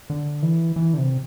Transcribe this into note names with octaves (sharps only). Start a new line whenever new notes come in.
D3
E3
E3
D3
C3